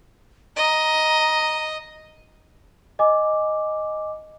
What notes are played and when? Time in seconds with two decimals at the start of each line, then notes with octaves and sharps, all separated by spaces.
0.57 D#5 A#5
2.99 D#5 G#5 D6